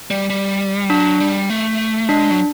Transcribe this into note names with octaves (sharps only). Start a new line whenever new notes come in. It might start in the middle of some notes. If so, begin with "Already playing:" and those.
G3
G3
F#3 D4
G3
A3
G#3 D4
F#3